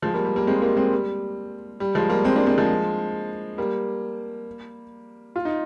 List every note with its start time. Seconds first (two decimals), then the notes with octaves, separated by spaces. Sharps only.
0.02 F3 G#3
0.14 G3 A#3
0.25 G3
0.36 G3 A#3
0.47 G#3 C4
0.62 G3 A#3
0.77 G#3 C4
0.92 G3
1.80 G3
1.95 F3 G#3
2.09 G3 A#3
2.24 G#3 C4
2.36 A#3 D4
2.46 G#3 C4
2.58 F3 G#3
3.58 G3 A#3
5.36 F4
5.45 D#4